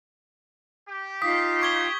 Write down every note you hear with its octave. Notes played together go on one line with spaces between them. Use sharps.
G4
D#4 F4 F5 D#6 B6
C#6 G#6 G7